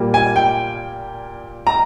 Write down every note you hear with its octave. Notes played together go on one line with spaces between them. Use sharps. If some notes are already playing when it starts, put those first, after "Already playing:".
Already playing: A#2 G3 A#3
G#5
G5
A#5